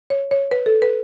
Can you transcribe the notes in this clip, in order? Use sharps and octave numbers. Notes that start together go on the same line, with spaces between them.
C#5
C#5
B4
A4
B4